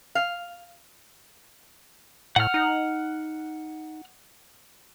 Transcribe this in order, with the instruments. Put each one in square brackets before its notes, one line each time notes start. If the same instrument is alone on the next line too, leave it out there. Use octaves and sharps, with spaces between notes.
[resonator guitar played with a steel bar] F5
[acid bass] A2 [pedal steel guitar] F#5 F6
[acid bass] D#4